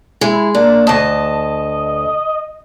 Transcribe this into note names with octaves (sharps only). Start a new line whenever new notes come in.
G#3 E4
A#3 D4
D2 D#5 A5